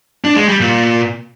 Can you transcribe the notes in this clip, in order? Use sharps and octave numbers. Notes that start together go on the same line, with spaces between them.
D4
G#3
G3
A#2